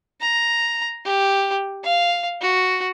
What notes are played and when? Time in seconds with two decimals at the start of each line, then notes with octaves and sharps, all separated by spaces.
0.21 A#5
1.05 G4
1.84 F5
2.41 F#4